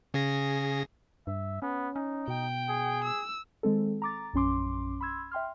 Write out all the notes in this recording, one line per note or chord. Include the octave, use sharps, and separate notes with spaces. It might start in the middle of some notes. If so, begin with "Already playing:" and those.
C#3 G#4 A#6
G2 E5
B3 C#4
C#4 D#4
B2 G5
G#4
E6
D#3 G#3 C4 A4
A#5 D6 A6
A#1 F#2 C#4 C6 D6
B5 C6 E6 G#6
E5 G5 C6 F6